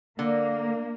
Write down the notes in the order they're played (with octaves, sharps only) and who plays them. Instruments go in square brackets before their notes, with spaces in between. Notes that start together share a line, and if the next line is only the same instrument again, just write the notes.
[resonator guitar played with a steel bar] D3 [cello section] A#3